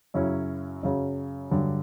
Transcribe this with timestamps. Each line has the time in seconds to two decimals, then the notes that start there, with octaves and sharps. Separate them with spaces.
0.14 F#2 C#3 F#3 C#4 E4
0.83 F#2 C#3 F#3
1.51 G2 D3 F#3